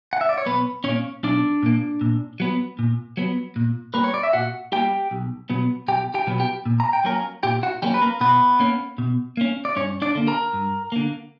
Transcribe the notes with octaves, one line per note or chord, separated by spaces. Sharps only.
F#5
E5
D5
C#5
B1 B3 B4
A#2 A#3 C#4 C#5
B1 D4 D5
A#2 A#3
A#2
F#3 B3
A#2
F#3 B3
A#2
G3 A#3 B4
C#5
D5
E5
A#2 F#4 F#5
G3 A#3 G4 G5
B1
B2 F#3 B3
B1 G4 G5
G4 G5
B2 F#3 B3
G4 G5
A#2
A#5
G5
F#3 A#3 C#4 A#4 A#5
A#2 G4 G5
F#4 F#5
F#3 G3 A#3 C#4 G4
B4
A#3 A#4
B2 B3 B4
A#3 C#4
B2
A#3 C#4
D5
G2 C#4 C#5
D4 D5
D3 A#3
A#4 A#5
G2
D3 A#3